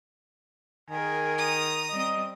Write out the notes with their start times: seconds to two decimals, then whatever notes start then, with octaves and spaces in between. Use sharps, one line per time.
0.90 D#3 G#4 A#4 G#5
1.38 A#5 D#6
1.91 G3 C4 D#5